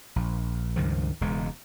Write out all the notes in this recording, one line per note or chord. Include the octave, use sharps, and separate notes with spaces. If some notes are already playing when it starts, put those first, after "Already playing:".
A#1
C#2 G2 D#3 F3
E1 E2 C#3 G#3